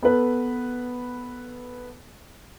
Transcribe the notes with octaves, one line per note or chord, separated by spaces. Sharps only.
B3 A4 B4